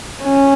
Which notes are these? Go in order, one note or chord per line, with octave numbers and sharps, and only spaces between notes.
C#4